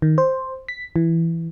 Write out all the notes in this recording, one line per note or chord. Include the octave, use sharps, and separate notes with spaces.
D#3
C5
B6
E3